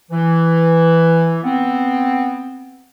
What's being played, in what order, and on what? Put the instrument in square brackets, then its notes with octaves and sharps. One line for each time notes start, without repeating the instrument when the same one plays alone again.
[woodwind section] E3
B3 C4